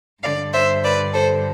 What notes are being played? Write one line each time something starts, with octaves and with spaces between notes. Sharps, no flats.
G2 D3 D5 F5
C5 E5
B4 D5
A4 C5